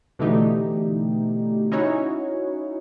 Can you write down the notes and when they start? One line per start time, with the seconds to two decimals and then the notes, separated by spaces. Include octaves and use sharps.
0.19 B2 D3 E3 A3 D#4 G4
1.71 C#4 D#4 E4 F#4 C#5